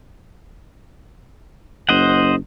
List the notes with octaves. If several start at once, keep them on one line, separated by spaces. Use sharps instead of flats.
F#1 C5 D#5 F#5